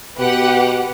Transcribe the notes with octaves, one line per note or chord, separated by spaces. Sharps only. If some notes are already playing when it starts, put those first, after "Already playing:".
B2 G4 B4 F#5